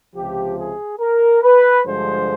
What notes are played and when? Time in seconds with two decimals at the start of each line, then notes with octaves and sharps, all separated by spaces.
0.14 C#2 C3 F3 G4
0.57 G#4
1.00 A#4
1.43 B4
1.85 G2 D3 F3 G#3 C5